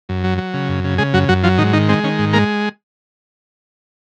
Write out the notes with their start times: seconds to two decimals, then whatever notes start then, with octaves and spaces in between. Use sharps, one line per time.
0.09 F#2
0.24 F#3
0.38 F#3
0.54 C#3
0.69 F#2
0.84 C#3
0.98 C#3 G#3 G#4
1.13 F#2 F#3 F#4
1.29 F#2 F#3 F#4
1.43 F3 F#3 F4
1.58 G#2 D#3 D#4
1.73 D#3 D#4
1.89 G#3 C4
2.04 D#3 C#4
2.19 G#2
2.33 G#3 A#3 A#4